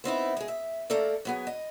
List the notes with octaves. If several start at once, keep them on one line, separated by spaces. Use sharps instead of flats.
B3 C4 D#4 E4
G#3 G#4
E5
A3 A#3 A4 A#4 D5
F#3 B3 G#4
D#5